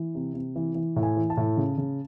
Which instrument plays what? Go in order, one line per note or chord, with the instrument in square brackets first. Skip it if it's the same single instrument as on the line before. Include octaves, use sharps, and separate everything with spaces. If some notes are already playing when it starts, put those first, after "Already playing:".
Already playing: [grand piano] E3
C3
C3
E3
E3
A2
G#5
E3
A5
A2
C#3
C#3